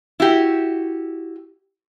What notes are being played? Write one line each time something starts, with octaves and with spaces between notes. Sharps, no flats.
E4 F#4 G4